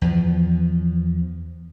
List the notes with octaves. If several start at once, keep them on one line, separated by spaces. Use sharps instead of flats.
E2 F3